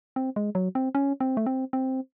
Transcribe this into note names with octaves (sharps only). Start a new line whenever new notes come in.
C4
G#3
F#3
C4
C#4
C4
A3
C4
C4